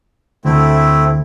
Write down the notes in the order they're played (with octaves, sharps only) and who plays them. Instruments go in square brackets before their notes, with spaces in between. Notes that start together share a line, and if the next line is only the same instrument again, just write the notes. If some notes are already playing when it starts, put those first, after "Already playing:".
[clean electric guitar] D2 [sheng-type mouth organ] A3 C4 E4